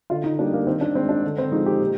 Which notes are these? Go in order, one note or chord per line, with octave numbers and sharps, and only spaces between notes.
D3 F4
D#4
G3 A#3 D4
A#3
D#3 C4
D4
G#3 C4
D4
D3
C4
F3 G#3 D#4
G4
A#2